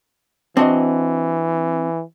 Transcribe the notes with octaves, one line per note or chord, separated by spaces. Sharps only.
E3 C4 D4 F#4 D#5